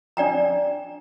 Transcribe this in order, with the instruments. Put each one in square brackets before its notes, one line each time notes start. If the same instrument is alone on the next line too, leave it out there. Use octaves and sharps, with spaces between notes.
[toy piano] D4 D5 G5 A#5